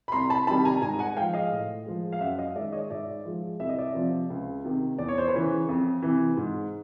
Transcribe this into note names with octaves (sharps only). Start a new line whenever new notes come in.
B5
C2 A#5 C6
A5 B5
C3 D#3 G3 A5 B5
G#5 A#5
G#2 G#5 A#5
F#5 G#5
F3 G#3 F5 G5
D#5 F5
A2
F3 G#3
F5
F#2 E5 F#5
D#5 F5
D#3 G#3 D5 E5
C#5 D#5
G#2 D5 E5
F3 G#3
C2 E5
D#5
D5 E5
C3 F3
C#2
C3 D#3
E2 D5
C#5
C5
B4 C#5
C#3 E3
F2
C3 E3
G#2